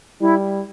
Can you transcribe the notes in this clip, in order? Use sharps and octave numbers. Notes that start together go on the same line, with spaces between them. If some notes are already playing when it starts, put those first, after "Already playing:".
G3 E4